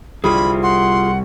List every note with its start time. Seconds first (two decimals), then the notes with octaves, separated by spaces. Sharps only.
0.24 C2 F4 G#4 B5
0.62 F#5 C6